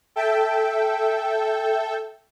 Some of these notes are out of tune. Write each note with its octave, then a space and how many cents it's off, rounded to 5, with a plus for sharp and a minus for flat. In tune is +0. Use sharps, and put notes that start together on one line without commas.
A4 -5 E5 +0 G5 +0